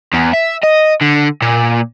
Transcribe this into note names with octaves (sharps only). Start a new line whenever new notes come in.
E2
E5
D#5
D3
A#2